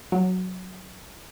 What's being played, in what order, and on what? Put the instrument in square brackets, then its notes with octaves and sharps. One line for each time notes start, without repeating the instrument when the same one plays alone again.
[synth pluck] F#3